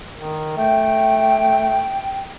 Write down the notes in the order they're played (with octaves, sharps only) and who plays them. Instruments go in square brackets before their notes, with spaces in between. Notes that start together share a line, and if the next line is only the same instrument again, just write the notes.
[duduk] D#3
[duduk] A3 [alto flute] G5